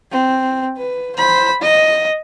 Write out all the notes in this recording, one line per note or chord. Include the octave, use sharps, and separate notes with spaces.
C4
B4
C5 B5
D#5